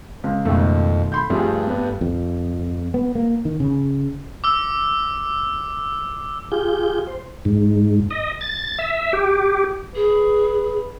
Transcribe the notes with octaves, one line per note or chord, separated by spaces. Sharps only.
C#2
F2 B2 D#3 A3
B5 C6 G6
G2 F3 G3 A3 G#4
G3 B3
F2
B3
A#3
D#3
C#3
D6 E6
F4 G4 G#4 G6
C5
G#2
D#5
A6
E5
G4
G#4 B4